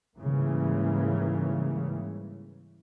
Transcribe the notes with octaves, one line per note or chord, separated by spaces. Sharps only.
G#2 C#3 E3 G3 A#3